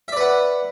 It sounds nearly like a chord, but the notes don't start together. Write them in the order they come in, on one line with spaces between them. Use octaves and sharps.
E5 D5 B4 F#5